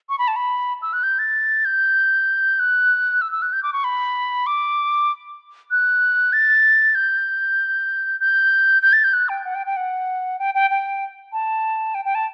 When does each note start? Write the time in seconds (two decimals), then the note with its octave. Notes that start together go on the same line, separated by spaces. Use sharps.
0.09 C#6
0.19 B5
0.28 A5
0.36 B5
0.82 E6
0.93 F#6
1.03 G6
1.19 A6
1.65 G6
2.59 F#6
3.21 E6
3.32 E6
3.42 F#6
3.53 G6
3.63 D6
3.73 C#6
3.84 B5
4.47 D6
5.71 F#6
6.33 A6
6.95 G6
8.20 G6
8.82 G6
8.93 A6
9.04 G6
9.13 F#6
9.29 G5
9.45 F#5
9.55 G5
9.66 G5
9.77 F#5
10.39 G5
10.55 G5
10.70 G5
11.33 A5
11.95 G5
12.05 G5
12.15 A5